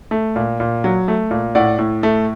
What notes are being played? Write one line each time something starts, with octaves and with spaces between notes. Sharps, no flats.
A3
A#2
A#2
F#3
A3
A#2
A2 D5 F#5
A2
A3